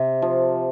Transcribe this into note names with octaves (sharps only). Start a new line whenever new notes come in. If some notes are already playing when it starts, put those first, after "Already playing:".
Already playing: C3
F3